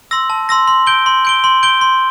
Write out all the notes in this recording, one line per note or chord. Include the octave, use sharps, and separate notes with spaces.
C6 E6 A#6
A5
C6 E6 A#6
C6
G6 D7 G7
C6
G6 D7 G7
C6
G6 D7 G7
C6